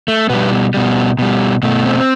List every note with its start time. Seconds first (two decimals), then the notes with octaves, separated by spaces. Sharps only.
0.08 A3
0.29 B2 G3 B3
0.74 B2 G3
1.19 B2 G3
1.63 B2 A3
1.85 C4